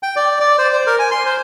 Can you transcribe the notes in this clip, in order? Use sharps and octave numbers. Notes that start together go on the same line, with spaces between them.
G5
D5
D5
C5
C5
A#4
G#5
C6
C5